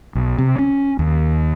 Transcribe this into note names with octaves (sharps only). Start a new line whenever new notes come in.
B1
C3
C#4
D#2